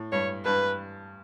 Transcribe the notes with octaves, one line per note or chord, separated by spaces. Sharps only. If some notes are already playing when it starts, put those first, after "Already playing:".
Already playing: A2
G2 C#5
G2 B4